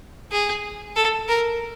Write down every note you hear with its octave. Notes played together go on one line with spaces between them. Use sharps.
G#4
A4
A#4